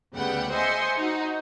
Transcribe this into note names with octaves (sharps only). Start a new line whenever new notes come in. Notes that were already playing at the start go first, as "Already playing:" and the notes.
D2 C#3 G3 B3 F#5 G5
C5 D#5 E5 G#5 C6 C#7
D#4 F#4